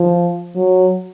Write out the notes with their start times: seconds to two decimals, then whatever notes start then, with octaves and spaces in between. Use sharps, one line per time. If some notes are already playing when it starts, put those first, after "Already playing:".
Already playing: F3
0.56 F#3